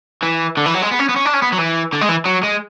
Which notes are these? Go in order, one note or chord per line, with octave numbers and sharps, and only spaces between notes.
E3
D3
E3
F#3
G#3
B3
C#4
B3
C#4
D4
C#4
B3
F#3
E3
D3
G#3
E3
F#3
G#3